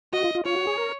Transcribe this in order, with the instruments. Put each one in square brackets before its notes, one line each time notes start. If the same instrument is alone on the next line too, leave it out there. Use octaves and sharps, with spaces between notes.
[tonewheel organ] F#4 [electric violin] D#5
[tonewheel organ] F4
F4
[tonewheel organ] F4 [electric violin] C#5
[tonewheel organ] F#4
G#4
A#4